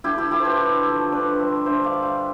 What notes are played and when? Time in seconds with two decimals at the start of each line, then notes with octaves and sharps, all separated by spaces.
0.04 D3 E4 G4
0.18 E4 G4
0.31 F3 A3 E4 G4
0.40 C5
0.45 G4 B4
0.58 D3
0.86 F3 A3
1.12 D3 B4 D5
1.39 G3 C5 E5
1.66 D3 C5 E5
1.84 D5 F5
1.93 G3
2.03 E5 G5